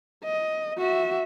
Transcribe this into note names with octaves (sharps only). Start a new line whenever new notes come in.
D#5
F#4 E5